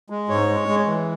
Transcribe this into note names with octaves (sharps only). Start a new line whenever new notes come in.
G#3
G#2 C#5
G#3
G#3
E3